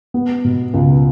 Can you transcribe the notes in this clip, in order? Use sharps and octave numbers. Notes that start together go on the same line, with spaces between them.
B3
B2
C#2